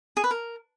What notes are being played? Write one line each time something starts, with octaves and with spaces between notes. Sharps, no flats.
G#4
B4
A#4